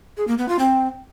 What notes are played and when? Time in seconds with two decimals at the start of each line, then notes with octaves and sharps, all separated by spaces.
0.17 G#4
0.28 A#3
0.38 B3
0.49 F4
0.59 C4